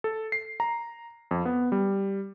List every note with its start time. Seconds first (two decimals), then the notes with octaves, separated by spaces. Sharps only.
0.04 A4
0.32 C7
0.60 A#5
1.31 F2
1.45 B3
1.72 G3